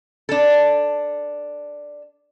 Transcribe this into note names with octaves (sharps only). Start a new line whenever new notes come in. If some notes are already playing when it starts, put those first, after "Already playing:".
D4 A4